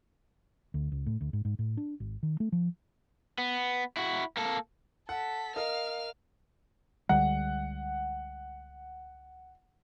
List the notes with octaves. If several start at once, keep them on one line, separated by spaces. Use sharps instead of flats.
D2
C#2
A2
D2
G#2
G#2
A2
D4
G#1
D#3
A3
F3
B3
E4 F#4
A#3 A4
A4 F#5 B6
A#4 D#5 F5 F6
C#2 D3 G3 F#5